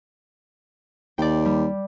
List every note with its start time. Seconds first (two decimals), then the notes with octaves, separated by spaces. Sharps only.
1.18 D#2 D5 G5
1.45 G3